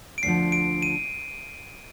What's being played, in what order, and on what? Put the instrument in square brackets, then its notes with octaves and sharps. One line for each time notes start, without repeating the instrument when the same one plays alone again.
[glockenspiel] D7
[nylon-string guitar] D2 D3 F3 [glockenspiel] C7
[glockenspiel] D7
D#7